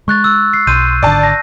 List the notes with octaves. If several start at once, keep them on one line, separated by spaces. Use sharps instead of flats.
G#3 C#6 F#6 A6
E6
C7
B1 C6 G6 D#7
G#1 D3 D5 A5
A#6